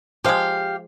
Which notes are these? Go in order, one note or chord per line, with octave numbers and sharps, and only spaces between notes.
F3 G#3 G4 F5